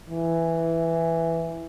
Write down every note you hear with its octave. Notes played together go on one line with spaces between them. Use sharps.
E3